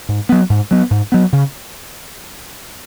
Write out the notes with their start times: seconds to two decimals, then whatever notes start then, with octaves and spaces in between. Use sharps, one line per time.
0.09 G#2
0.29 F#3 B3
0.50 G#2
0.71 F#3 B3
0.91 G#2
1.12 F#3 B3
1.33 C#3